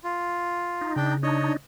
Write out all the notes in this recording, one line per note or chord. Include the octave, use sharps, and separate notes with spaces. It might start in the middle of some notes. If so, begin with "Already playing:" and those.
F4
D#4
C#3 D4 G5
D4 D#4 C#5 D#5